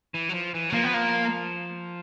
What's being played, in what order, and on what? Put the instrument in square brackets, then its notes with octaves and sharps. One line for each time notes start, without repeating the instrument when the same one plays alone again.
[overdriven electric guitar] E3
F#3
F3
E3
F#3
[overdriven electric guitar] F3 [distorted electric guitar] A#3
[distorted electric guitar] B3
A#3